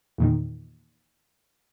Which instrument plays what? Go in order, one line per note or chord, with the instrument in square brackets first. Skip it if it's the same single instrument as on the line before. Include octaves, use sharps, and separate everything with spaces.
[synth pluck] E2 A#2 D#3